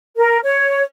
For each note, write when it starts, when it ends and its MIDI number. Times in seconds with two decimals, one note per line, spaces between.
0.17 0.38 70
0.43 0.83 73